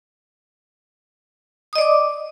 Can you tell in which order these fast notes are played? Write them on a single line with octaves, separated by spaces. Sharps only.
D#6 D#5 D5 D6